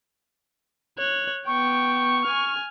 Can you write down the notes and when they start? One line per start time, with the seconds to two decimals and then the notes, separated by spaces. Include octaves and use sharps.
0.98 C#5 F#6
1.47 B3 G5 C#6
2.25 G#5 F6